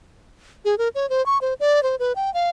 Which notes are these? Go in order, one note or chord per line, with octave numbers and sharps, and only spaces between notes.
G#4
A#4
C#5
C5
C#6
C5
D5
C5
B4
G5
F5